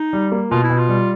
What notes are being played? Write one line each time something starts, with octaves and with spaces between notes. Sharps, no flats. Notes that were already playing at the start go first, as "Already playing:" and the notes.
Already playing: D#4
G3
A#3
B2 F4
E4
B2
F4
G3